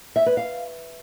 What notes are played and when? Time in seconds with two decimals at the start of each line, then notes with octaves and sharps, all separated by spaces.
0.16 E5
0.26 B4
0.37 F5